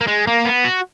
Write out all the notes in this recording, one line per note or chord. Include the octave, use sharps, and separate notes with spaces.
A#3
G#3
A#3
B3
F#4